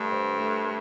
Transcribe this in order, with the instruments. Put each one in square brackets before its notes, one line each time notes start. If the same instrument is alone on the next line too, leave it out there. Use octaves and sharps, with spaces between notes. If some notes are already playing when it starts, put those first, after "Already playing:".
Already playing: [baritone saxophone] G2 [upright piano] A3 D4
[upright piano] C5
A3
A3